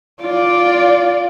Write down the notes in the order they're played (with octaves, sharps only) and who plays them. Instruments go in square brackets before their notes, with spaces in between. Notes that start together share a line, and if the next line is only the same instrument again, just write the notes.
[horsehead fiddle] F4 D5